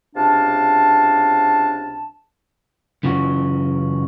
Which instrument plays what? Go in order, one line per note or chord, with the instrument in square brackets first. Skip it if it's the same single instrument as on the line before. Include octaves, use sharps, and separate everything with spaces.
[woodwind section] C#2 C3 D4 F5 A5
[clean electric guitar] F#2 C#3 E3 F4 F#4